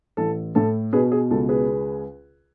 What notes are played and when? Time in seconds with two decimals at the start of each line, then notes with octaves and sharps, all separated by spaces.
0.17 A1 A4
0.55 A2 A4
0.93 B2 G#4 B4
1.12 G#4
1.31 C#2 A4
1.49 G#4 B4